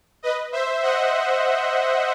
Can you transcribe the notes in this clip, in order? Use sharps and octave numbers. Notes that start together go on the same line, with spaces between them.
B4 D#5
C5 E5
D#5 F#5